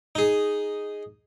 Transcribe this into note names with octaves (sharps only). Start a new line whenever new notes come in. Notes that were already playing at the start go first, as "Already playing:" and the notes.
D#4 G#4